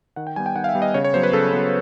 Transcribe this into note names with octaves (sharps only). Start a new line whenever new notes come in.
D#3 F#5
G5
G3 B3 G#5
G5
D#3 F#5
F5
E5
G3 B3
D#5
C#3 C#5
C#5
F#3 B3 C5
B4
C#3 A4
F#3 B3